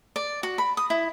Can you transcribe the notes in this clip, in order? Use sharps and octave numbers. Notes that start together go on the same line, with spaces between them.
D5
F#4
B5
D#6
E4